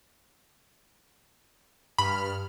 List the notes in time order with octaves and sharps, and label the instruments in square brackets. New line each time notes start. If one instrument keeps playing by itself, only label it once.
[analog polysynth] G2 F6 [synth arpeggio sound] B5